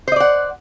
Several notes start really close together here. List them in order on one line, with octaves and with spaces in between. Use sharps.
C5 D#5 D5 F#5